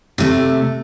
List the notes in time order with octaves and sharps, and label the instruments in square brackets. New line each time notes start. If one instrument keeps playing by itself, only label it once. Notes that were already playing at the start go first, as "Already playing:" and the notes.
[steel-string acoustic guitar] C3 A3